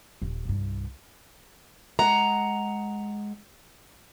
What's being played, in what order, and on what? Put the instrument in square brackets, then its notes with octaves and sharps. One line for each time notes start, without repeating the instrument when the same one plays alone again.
[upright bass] D#1
C2 G2
[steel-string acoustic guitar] G#3 F#5 A#5